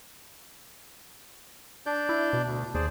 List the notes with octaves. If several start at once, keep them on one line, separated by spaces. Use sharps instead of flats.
D4 D5 G6
E4
B2
D2
D#2 G#4 C5 D5